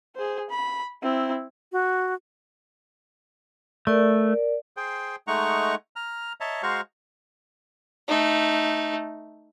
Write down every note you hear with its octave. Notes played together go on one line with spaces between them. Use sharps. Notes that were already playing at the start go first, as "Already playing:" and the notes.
G#4 C5
B5
C4 E4
F#4
A3 A#4 D5
G#4 C5 G5
G#3 A3 D#4 F#5 A#5 C#6
A#5 F6
C#5 D#5 E5 A5 A#5
G#3 F#4 C5 F5 A#5 C#6
A3 D#4